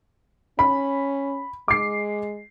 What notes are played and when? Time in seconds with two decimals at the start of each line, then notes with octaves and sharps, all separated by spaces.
0.59 C#4 B5
1.68 G#3 D6 C7